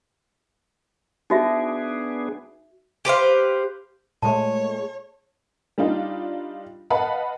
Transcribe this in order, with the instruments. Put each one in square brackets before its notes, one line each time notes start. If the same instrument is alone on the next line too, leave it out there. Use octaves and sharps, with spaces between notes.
[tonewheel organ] B3 D4 G#4 [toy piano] D#4 F#4 E5
[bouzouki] G4 B4 C5 F5
[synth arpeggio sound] A#2 G#3 A3 [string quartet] C#5 [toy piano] A5
[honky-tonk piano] G3 D4 D#4 F4
B4 D#5 F5 F#5 A5 B5